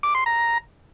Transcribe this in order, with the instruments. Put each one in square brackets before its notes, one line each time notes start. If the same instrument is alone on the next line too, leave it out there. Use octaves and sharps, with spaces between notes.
[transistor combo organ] D6
C6
A#5